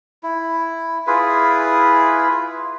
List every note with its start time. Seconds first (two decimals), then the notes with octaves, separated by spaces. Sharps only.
0.23 E4
1.07 E4 F4 G#4 B4